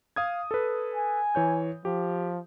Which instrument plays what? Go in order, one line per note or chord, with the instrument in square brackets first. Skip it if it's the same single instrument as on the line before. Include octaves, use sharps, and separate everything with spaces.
[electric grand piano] F5 D#6 G#6
A4 B4
[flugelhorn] G#5
[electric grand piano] E3 C#5 G6
[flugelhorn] F3 [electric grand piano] G4